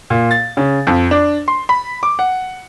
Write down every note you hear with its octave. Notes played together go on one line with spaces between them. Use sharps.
A#2
A6
C#3
F2
D4
C6
B5
D6
F#5